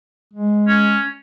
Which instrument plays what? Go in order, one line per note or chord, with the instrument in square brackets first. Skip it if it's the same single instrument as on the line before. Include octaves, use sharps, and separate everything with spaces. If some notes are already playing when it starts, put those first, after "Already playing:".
[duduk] G#3
[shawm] C#4